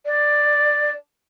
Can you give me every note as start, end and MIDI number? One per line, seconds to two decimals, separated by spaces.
0.05 0.91 74